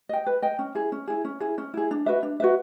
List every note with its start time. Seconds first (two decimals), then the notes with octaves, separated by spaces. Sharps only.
0.09 D#5 G5
0.26 B4
0.42 D#5 G5
0.59 C#4
0.75 E4 G#4
0.92 C#4
1.08 E4 G#4
1.24 C#4
1.40 E4 G#4
1.58 C#4
1.74 E4 G#4
1.91 D4
2.06 F#4 B4 E5
2.23 D4
2.40 F#4 B4 E5